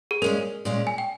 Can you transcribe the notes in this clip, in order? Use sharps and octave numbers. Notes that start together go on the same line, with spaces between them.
G#4
A#2 G#3 C#4 A#4
A#2 G#3 C#4
G#5
G5